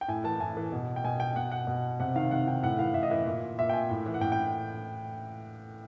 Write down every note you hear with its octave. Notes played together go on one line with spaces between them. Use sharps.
G5
A2 G#5
E3 A5
A2 G#5
E3
B2
G5
B2 G#5
G5
B2 F#5
F#5
B2
C3 F#5
D#3 F5
C3 F#5
D#3 G5
A2 F#5
E3 F5
A2 E5
D#5
E3 E5
A#2
A#2 E5
G5
G#5
A2
E3
F#5
A2 G5
G5